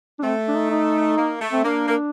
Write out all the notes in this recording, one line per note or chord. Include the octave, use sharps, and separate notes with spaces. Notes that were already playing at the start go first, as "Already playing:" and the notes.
D4
A3 C4
D4
D#4
D#4
A#3
A3
C4
A#3 D4
A#3